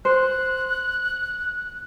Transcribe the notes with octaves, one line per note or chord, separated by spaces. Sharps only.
C5 F#6